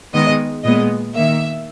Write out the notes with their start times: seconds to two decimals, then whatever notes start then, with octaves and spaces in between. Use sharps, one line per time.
0.14 D#3 G#3 B3 D#5
0.64 A#2 G#3 B3 D#5
1.14 D#3 A#3 E5